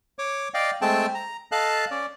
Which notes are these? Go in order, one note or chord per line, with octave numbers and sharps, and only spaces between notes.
C#5 D6
D5 D#5 F5 G5
G#3 A3 C4 G5 A5
A#5
A4 D#5 F5 A5 F#6
C#4 D5